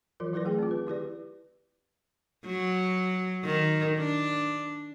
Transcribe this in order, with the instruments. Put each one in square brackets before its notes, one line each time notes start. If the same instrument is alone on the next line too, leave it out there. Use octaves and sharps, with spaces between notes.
[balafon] E3 F#3 F4 A#4
F#3 E4 A#4 B4 D5
A3 G#4 G5
C4 F4
B4
E4 G4 B4 D5
[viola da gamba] F#3
D#3
D4